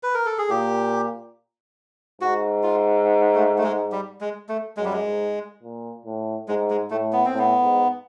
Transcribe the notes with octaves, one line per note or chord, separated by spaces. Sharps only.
B4
A#4
A4
G#4
A#2 G4
G#2 F#4
F4
A3
A3
G#3
G3
G#3
A3
F#2 G#3
G3
G#3
G#2
A#2
A2
G#2 G#3
G#3
A2 A3
B3
C4
A2
B3
G#2